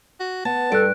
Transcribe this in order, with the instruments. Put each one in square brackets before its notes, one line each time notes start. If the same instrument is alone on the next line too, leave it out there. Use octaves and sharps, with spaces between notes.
[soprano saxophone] F#4
[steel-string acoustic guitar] B3 [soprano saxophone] A5
[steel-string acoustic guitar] G2 [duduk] A4 [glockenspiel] F#6 D7